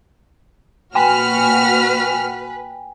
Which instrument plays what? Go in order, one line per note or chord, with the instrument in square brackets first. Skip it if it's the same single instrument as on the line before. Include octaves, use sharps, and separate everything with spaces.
[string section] A#2 F#4 F6 [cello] B4 [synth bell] G5 G#5